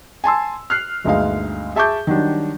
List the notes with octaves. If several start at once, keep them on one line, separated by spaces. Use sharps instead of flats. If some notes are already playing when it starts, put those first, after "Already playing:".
G#5 A5 C6 E6
F6 F#6 C7
G1 D2 G#3 D#4 F5
G#4 E5 A5 C#6 D6 G6
D#3 F#3 G3 D4